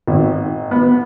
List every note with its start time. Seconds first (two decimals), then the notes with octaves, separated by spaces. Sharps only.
0.08 G#1
0.71 B3